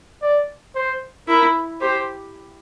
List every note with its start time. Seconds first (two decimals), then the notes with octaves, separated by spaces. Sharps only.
0.22 D5
0.75 C5
1.28 E4 A#4
1.81 G4 C5